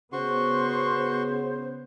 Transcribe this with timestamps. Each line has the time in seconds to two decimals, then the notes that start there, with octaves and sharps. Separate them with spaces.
0.13 C#3 B3 F#4 C5 C6 C#6